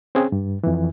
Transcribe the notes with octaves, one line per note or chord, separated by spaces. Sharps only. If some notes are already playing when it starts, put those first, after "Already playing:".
C4 C#4 G#4
G2
F2 E3